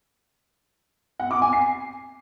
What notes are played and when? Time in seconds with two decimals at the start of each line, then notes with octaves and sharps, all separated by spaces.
1.20 F#5
1.31 D6
1.42 G#5
1.53 C7